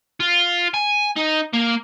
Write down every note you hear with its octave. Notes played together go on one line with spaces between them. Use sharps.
F4
G#5
D#4
A#3